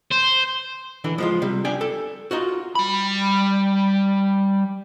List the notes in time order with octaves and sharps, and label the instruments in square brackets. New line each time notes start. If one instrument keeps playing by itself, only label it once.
[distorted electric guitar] C5
[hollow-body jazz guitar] D3 E3 D4
F3 G#3 F4
C3 G3
D4 G4 G5 G#5
A4
D#4 F4 F#4
[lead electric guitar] G3 B5